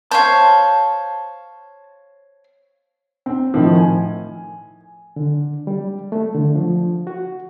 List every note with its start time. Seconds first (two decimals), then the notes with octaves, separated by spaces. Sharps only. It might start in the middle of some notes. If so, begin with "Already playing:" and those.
0.11 C5 C#5 F5 A5
3.26 C4
3.54 A2 D#3 F3
3.77 G#5
5.16 D3
5.67 G3
6.12 A3
6.35 D3
6.55 F3
7.07 F#4